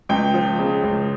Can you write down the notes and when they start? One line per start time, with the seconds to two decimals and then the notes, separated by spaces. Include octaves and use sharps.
0.09 C#2 G5
0.34 F3
0.59 C#3
0.84 C#2